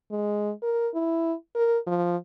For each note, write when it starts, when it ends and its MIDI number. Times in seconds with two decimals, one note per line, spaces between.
0.11 0.51 56
0.62 0.88 70
0.94 1.33 64
1.55 1.78 70
1.87 2.16 53